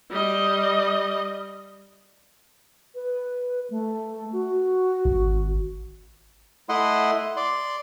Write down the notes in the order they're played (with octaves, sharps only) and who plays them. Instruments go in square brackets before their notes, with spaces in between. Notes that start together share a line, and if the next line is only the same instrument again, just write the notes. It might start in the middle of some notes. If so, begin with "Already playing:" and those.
[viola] G3 D#5
[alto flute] B4
A3
F#4
[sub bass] G#1
[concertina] A3 E4 D#5 F#5 C6
D5 C6